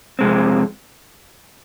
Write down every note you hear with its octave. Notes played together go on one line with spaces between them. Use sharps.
F2 C3 D#3 G#3 C4